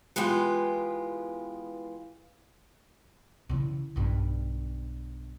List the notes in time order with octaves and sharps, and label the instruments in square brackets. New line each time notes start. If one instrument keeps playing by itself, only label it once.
[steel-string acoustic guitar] E3 G#3 B3 F4 G4
[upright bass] C#3 E3
B1 G2